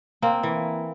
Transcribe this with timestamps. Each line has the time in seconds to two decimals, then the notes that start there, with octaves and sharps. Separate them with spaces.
0.22 A#3 C4
0.43 E3